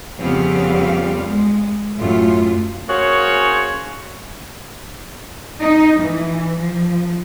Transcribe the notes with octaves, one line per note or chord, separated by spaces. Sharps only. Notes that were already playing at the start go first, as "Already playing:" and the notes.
F2 C#3 G3 B3 C4 F5
G#3
F#2 A2 A3 F4
A#3 C#4 F#4 G#4 C5 C#5
D#4
E3
F3